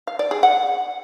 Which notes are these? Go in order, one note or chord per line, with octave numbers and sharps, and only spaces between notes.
F5
D5
G#4
F#5